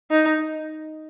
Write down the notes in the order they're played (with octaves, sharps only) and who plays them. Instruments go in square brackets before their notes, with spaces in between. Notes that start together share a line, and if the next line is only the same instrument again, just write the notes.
[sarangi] D#4